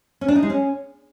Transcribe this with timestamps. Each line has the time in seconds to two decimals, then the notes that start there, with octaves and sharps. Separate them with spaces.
0.21 C#4
0.28 D4
0.36 D#4
0.43 G#3
0.50 C#4